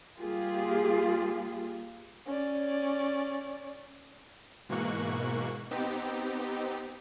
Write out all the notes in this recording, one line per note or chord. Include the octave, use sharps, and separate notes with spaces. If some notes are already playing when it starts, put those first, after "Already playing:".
G3 A#3 F4 G4 G#4
C#4 D5
G#2 B2 E3 A#3 C#6 F#6
B3 C4 D#4 G4